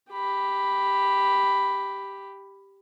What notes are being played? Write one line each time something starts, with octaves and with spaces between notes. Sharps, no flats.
G4 B5